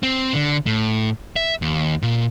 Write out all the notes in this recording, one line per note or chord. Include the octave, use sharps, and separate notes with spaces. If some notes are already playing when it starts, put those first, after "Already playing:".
C4
D3
A2
E5
D#2
A#2